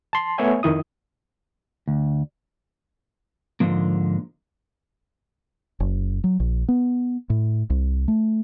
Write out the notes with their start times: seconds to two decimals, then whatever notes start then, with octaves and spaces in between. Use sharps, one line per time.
0.13 A5 C6
0.38 A3 B3 C#5 E5 G#5
0.63 F2 D#3 E4 D#6
1.88 D2
3.60 G#2 D3 F3 A#3
5.80 F#1
6.24 F#3
6.40 A#1
6.68 B3
7.30 A2
7.70 C2
8.08 A3